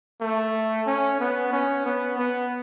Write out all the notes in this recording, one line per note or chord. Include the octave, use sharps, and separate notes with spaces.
A3
C#4
B3
C#4
B3
B3